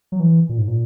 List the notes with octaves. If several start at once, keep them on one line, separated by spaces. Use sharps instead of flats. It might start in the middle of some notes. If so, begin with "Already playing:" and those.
F#3
E3
A#2
G#2
A#2